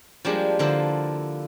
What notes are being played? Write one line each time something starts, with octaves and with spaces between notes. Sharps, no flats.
F3 G3 G#3 A#3 D4 G4
D3 F3 A#3 E4 A4 C5